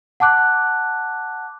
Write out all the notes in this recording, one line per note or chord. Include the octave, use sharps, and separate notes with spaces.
F#5 A5 D6 F#6